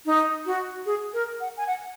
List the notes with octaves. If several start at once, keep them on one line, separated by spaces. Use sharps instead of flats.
D#4
F#4
G#4
A#4
F#5
G#5
F#5